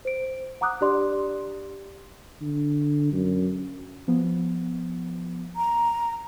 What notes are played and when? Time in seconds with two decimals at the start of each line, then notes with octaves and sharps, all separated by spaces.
0.05 C5 D7
0.61 F#5 A#5 D6 D#6 F#6
0.81 D4 G4 D5 C6
2.41 D3
3.13 F#2
4.08 F3 B3
5.56 A#5